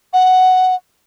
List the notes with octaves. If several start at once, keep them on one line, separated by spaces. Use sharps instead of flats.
F#5